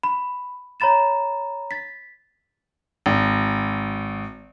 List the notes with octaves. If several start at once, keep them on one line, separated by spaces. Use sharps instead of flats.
B5
C#5 A#5 B5 A6 E7
A6 B6
G#1